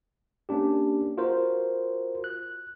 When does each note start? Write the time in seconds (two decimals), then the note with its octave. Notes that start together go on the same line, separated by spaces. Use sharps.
0.49 A#3 C#4 D4 G4
1.18 F4 F#4 A#4 C5
2.24 F#6